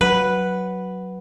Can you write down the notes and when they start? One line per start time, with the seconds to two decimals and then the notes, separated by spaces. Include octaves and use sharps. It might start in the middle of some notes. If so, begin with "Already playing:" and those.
0.01 F#3 B4 F#5